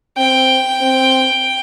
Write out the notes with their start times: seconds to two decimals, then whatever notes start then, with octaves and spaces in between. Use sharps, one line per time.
0.18 C4 G5
0.82 C4